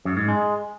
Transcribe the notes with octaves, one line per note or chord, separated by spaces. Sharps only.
F#2
G#2
G#3